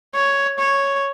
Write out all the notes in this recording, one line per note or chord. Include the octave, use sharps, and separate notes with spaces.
C#5
C#5